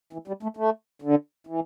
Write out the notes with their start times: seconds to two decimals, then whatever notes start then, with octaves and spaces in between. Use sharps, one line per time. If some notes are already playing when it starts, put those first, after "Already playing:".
0.13 E3
0.28 G3
0.43 A3
0.57 A3
1.02 D3
1.47 E3